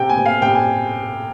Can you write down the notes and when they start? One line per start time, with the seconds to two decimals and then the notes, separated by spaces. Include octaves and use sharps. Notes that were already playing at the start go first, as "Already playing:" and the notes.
Already playing: C3 G5
0.09 G#5
0.17 C3
0.26 F5
0.42 C3 G5
0.55 G#5